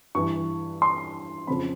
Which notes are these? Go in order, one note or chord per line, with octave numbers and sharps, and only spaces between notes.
G2 E3 C#6
C6
F2 C#3 F3 B5